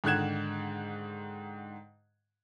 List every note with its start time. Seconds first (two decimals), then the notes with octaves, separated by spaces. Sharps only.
0.04 G#2 D3 D#3 F#6 G#6 E7